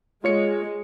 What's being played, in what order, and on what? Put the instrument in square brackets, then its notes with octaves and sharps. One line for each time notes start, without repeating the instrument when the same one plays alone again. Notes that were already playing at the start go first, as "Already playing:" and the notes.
[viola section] G#3 [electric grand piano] F4 C#5 C#7